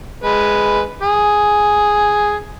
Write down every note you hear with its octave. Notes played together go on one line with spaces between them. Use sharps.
G#3 B4
G#4